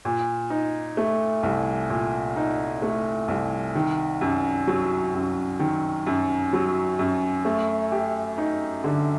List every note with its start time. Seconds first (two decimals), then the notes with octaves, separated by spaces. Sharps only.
0.05 A#2
0.50 D#4
0.97 A3
1.43 C2
1.90 A#2
2.36 D#4
2.82 A3
3.28 C2
3.75 D#3
4.21 F#2
4.67 F#3
5.14 F#2
5.60 D#3
6.07 F#2
6.53 F#3
6.99 F#2
7.45 A3
7.92 G4
8.38 D#4
8.84 D3